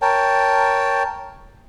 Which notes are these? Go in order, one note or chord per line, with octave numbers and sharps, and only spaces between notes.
A#4 C#5 G5 A5